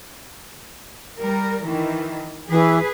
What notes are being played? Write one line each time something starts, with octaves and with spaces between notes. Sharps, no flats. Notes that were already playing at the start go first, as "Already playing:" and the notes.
G3 A#4
D#3 E3
E3 G#4 B4